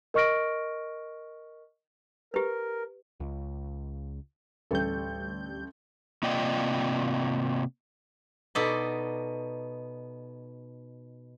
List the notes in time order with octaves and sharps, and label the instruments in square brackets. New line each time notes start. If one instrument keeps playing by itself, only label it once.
[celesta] A#4 D#5 C#6 F6 A#6 D7
[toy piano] G4 B4 [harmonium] A#4
[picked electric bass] C#2
[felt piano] A1 A4 [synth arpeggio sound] D2 G3 G6
[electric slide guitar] C3 A#3 F4 D5 D#5 G5
[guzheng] B2 D#4 A4 D5 B5